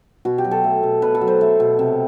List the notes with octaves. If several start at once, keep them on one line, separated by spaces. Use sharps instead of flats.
B2 F#4
G4
F#3
A4
A3
B2
B2 B4
A4
F#3
C5
A3
B2
C3